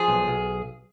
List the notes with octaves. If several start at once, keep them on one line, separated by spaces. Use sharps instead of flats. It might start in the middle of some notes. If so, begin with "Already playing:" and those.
Already playing: F3 G#4
B1
B1